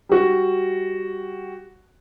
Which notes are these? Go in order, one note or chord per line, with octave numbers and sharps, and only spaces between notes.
G3 F#4